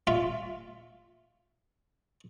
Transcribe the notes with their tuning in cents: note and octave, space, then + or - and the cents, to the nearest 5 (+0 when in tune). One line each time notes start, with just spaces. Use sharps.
F4 +0 E5 +10